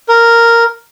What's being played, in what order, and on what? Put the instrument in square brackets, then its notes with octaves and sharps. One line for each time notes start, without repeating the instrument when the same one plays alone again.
[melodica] A#4